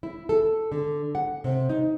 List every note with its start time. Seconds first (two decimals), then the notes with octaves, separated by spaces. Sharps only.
0.03 E4
0.29 A4
0.72 D3
1.15 F#5
1.44 C3
1.69 D#4